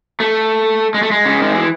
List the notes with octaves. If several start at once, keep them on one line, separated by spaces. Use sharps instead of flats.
A3
G#3
A3
G#3
C#3
D#3
E3